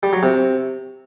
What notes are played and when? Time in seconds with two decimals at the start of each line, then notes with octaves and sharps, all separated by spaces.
0.03 G3
0.13 F#3
0.23 C3